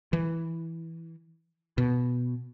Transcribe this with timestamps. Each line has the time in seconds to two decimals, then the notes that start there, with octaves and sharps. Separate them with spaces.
0.13 E3
1.78 B2